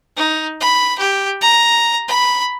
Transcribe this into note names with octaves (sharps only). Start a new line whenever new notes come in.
D#4
B5
G4
A#5
B5